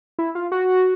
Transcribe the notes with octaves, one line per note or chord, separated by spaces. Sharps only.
E4
F4
F#4